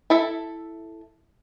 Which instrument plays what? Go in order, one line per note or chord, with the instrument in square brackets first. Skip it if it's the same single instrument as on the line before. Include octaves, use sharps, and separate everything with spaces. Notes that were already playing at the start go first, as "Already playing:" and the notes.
[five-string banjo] E4 A4 E5